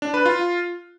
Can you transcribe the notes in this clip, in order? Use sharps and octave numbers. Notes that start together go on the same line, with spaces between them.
D4
B4
F4